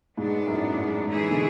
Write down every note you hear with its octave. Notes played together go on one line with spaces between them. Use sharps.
G#2 B2 F#3 B3 D4
F#2 A2
G#2
G#2 E3 A3 E4 G#4
B2 D3